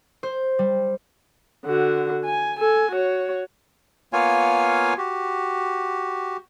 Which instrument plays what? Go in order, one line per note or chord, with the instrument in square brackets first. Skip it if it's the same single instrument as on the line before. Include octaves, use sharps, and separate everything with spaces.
[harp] C5
G3
[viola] D3 F#4
G#5
A4 G#5
F#4 C#5
[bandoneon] A#3 B3 F4 C#5 F5 G#5
F#4 G4